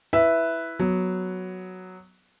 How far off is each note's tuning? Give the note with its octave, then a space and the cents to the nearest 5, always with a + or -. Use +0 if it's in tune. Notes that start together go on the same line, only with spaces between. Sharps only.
E4 +0 B4 +0 E5 +0
F#3 +0 B3 +0